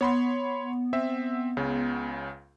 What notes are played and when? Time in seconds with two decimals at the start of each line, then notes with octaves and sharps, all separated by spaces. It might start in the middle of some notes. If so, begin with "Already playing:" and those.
0.01 B3 C#5 B5 C6
0.93 C4 E5
1.57 C#2 C#3